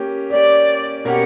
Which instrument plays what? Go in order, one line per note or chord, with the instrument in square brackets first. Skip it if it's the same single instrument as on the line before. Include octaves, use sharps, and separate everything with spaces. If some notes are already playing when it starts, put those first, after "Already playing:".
Already playing: [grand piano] A#3 C#4 G4
[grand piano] A#3 C#4 G4 [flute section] D5
[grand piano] B2 A#3 C#4 G4 A#4 [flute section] F#5